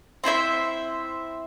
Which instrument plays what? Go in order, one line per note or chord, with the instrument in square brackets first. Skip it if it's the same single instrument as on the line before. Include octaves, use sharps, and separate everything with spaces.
[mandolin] C4 E4 C5 E5